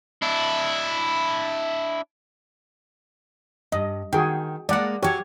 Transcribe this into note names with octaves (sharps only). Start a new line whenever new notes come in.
D4 E4
G2 D#5
D#3 F#4 G#4 G5
G#3 A#3 D5 F#5
F#3 G4 G#4 C#5